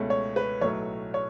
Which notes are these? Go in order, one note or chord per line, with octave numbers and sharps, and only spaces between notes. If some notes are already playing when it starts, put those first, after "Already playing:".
Already playing: C#2 B2 A3 C#4
C#5
B4
B1 A2 F#3 A3 C#5
C#5